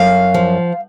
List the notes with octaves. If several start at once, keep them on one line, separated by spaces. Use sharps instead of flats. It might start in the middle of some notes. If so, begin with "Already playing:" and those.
Already playing: F#2 F5
F3